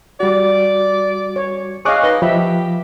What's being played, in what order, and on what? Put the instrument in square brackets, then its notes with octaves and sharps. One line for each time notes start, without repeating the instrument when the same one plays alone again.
[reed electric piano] G3 F#4 [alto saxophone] D5
[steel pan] C#5
[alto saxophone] G#4 [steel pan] C#5 D#5 F5 [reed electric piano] C#6 D6 F#6
[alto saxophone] D#4 [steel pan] B4
[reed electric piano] F3 [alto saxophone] G4 [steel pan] E5 B5